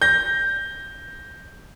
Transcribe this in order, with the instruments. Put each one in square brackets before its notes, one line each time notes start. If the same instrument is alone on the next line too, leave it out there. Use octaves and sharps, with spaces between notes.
[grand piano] G6 A#6